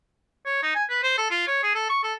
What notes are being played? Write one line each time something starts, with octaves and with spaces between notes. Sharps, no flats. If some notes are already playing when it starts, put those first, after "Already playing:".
C#5
D#4
G#5
B4
C5
A4
F4
C#5
G#4
A4
C#6
A4